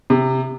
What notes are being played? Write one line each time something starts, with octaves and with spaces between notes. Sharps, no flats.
C3